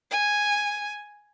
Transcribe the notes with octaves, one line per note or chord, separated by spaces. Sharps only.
G#5